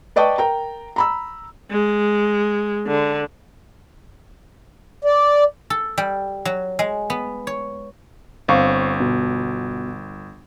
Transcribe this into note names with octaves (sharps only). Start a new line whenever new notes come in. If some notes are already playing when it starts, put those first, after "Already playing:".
B4 D5 D#5 G5 A5 C#6
A#4 G5 A#5
A#5 B5 E6
G#3
D3
D5
A4
G3
F#3
G#3
B3
C#5
G1 C4 F5 C#6
B2